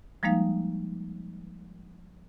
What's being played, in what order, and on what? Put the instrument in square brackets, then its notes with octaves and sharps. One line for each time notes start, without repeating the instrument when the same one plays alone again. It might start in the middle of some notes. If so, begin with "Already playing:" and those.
[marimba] F3 G3 G#3 A#3 D#4 F5